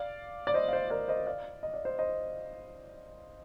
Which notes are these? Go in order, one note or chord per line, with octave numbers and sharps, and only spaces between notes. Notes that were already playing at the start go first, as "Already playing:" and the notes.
Already playing: D5 F5
D5
C5 D#5
F5
C5 D#5
A#4 D5
C5 D#5
D5 F5
D#5
D5
C5 D#5
C5 D#5